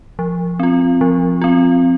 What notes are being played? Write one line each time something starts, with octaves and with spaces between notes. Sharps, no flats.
F3
C4 F4
F3
C4 F4